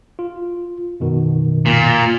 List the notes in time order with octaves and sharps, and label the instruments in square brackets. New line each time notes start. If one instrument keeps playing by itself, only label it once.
[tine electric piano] F4
F#2 B2 D#3
[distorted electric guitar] A#2